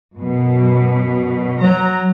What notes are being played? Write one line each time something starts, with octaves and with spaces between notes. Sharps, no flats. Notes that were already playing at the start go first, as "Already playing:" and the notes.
F#2 B2
F#3 A#5